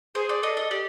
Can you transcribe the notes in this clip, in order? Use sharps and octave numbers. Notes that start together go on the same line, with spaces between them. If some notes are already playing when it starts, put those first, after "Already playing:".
G#4 C5
D5
A4 D#5
D#5
G4 D5